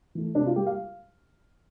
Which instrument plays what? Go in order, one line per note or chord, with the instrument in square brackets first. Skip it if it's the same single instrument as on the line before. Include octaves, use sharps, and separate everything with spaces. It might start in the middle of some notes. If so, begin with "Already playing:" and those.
[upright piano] E3 A3
C3 D4
F4
G3 A#3 G4
F5